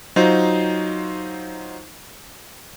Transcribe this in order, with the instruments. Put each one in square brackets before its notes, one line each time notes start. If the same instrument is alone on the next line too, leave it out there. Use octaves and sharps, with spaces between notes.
[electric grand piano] F#3 D#4 F4 C5